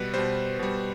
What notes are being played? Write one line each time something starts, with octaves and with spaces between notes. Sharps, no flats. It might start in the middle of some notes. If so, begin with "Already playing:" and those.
Already playing: B2 G3 B4
B2 G3 C5
B2 G3